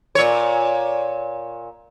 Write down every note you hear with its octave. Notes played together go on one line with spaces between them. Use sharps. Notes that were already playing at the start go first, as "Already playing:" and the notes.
A#2 C#5